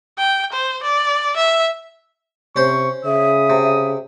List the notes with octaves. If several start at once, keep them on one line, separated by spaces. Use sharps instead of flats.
G5
C5
D5
E5
C3 C#4 C5 C#6
C#3 E5 D#6
C3